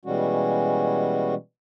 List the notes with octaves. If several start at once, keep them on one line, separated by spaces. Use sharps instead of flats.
B2 E3 G3 G#3 C#4 F#4